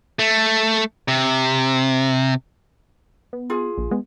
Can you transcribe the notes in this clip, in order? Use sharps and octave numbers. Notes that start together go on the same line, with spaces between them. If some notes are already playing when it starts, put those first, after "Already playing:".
A3
C3
B3
F4 G#4
A#1
G#3 B3